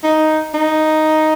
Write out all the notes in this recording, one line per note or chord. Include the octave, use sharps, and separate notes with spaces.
D#4
D#4